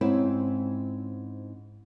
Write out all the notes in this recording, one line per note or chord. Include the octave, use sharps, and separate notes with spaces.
G#2 C4 C#4 E4